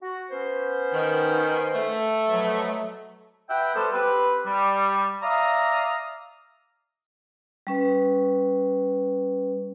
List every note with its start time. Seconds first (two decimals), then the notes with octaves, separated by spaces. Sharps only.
0.02 F#4
0.31 B3 C#4 C5
0.93 D#3
1.75 A3
2.29 B2 F3 F#3
3.49 B4 E5 F#5 G5
3.74 G3 B3 A4 B4 C5
3.92 C4 G4 B4
4.46 G3
5.22 D5 E5 F5 A#5 D#6
7.67 G3 C#4 B4